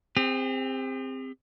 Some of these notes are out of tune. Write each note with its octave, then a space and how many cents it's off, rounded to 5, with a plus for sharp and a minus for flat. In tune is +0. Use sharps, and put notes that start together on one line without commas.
C4 +0 G#4 -45